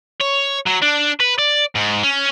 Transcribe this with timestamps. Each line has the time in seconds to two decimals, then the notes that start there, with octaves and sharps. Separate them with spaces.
0.21 C#5
0.67 F#3
0.83 D4
1.20 B4
1.39 D5
1.75 G#2
2.03 C#4